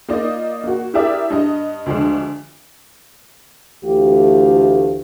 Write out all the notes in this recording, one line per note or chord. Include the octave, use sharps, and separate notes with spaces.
A#3 D#4 F4 D5 D#5
A#3 F#4
E4 G4 G#4 A#4 D5 E5
G2 D#5
D2 F3 G#3 D4
D2 E3 A3 F4 G4